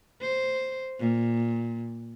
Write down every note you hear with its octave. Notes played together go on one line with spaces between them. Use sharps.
C5
A#2